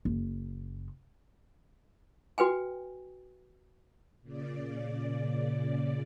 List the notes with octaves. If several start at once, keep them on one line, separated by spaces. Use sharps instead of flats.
F#1
F#4 B4 G5 G#5
A#2 C#3 D5